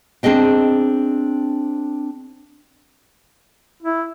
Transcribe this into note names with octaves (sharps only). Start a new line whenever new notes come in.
C4 D4 G#4 D#5 G5
E4